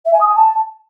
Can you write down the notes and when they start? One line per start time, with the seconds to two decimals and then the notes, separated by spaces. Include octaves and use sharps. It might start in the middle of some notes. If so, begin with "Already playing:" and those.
0.05 E5
0.13 G#5
0.20 D#6
0.28 G#5
0.35 A5